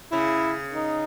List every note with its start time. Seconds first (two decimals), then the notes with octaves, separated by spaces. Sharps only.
0.12 C#3 E4
0.73 D#4